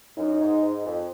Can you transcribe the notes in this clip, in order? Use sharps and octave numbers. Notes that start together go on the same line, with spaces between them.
F#2 D#4
G#2
G#2
F2